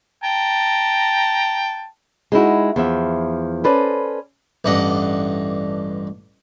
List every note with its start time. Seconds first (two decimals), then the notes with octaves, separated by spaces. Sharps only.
0.23 G5 A5 A#5
2.32 G#3 D#4 E4 F#4
2.76 E2 F3 E5
3.64 C#4 A4 B4 C5 D5
4.65 A1 G2 D4 D#5 F#5